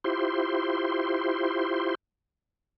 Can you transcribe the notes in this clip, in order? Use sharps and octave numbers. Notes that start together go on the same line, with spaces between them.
E4 F4 G4 C5 C6